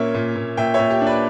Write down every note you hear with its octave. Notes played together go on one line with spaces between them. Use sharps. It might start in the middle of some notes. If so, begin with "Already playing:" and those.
Already playing: A#2 A#3 C#4 C#5 E5
A#2
A#2
A#2 E5 G5
A#2 C#5 E5
G4
D4
B4 D5